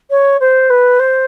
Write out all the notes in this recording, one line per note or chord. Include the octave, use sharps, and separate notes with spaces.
C#5
C5
B4
C5